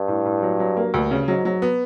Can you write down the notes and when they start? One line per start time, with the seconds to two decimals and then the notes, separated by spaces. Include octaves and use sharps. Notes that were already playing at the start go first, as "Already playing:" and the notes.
Already playing: G2
0.08 A2
0.25 A2
0.42 F#3
0.60 F#3
0.77 A#3
0.94 D2 G2
1.11 C#3
1.28 G#2 F#3
1.45 F#3
1.62 B3